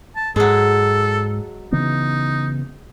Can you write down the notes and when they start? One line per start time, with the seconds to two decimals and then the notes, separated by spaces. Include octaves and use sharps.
0.16 A5
0.36 G#2 F#3 G#3 A4
1.72 C#3 E3 B3 D#4